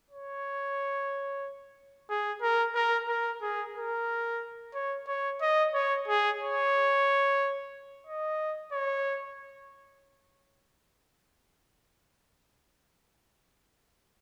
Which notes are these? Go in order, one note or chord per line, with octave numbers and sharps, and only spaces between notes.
C#5
G#4
A#4
A#4
A#4
G#4
A#4
C#5
C#5
D#5
C#5
G#4
C#5
D#5
C#5